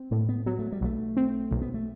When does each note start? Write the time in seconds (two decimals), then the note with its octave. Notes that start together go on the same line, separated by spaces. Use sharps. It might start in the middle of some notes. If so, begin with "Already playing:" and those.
Already playing: C4
0.11 A2 A3
0.29 B3
0.46 F#3 B3
0.59 A3
0.72 G3
0.81 B1 A3
1.17 C4
1.51 B1
1.62 B3
1.74 A3